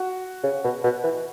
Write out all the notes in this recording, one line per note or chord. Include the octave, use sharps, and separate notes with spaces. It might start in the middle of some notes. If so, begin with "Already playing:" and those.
Already playing: F#4
C#3
B2
B2
E3